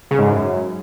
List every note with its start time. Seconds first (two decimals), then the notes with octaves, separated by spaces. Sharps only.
0.11 C#3
0.19 G#2
0.26 F#2